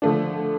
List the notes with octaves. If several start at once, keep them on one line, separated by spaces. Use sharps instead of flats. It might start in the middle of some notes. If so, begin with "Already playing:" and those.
D3 F3 A3 D4